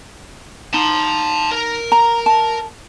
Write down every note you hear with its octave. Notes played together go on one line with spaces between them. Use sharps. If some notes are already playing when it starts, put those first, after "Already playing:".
D#4 A5 C6
A#4
A#5
A5